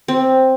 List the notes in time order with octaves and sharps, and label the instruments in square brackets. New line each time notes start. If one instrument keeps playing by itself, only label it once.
[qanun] C4